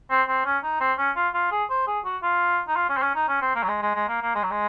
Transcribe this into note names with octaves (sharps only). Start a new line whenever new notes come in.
C4
C4
C#4
D#4
C4
C#4
F4
F4
G#4
C5
G#4
F#4
F4
D#4
F4
C#4
C4
C#4
D#4
C#4
C4
A#3
F#3
G#3
G#3
G#3
A#3
A#3
G#3
F#3
G#3